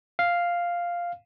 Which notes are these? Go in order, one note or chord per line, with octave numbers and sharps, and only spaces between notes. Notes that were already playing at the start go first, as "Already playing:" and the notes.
F5